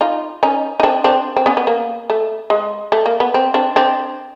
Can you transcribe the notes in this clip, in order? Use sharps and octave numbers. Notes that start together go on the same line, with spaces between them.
D#4 F4
C#4 D#4
D#4
C4 D4
C4 D4
C4
B3 C#4
B3
A#3
A3
G#3
A3
A#3
B3
C4
C4 D4
C4 D4